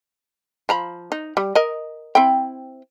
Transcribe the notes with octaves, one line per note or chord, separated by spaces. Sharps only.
F3 A#5 B5
D#4
G3
A#4 D#5
C4 E4 G5